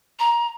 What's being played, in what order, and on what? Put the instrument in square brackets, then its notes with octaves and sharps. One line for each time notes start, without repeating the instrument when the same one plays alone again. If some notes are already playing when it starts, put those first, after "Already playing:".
[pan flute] A#5